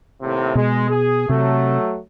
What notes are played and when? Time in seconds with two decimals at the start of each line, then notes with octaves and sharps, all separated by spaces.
0.22 D#2 A2 C3
0.55 B2 G#3
0.89 G#4
1.29 C3 F#3 A3